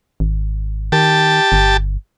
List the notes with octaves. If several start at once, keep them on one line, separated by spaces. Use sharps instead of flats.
G#1
D#3 G4 A5
G1